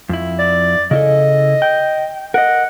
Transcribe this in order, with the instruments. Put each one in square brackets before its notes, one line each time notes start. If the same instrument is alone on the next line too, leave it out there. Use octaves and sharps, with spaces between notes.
[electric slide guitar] F2 E4
[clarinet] D5
[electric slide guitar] C#3 E4 A4 [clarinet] D#5
[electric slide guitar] G5
[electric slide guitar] A#4 D#5 [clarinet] F#5